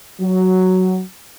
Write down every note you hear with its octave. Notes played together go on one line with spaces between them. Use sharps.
F#3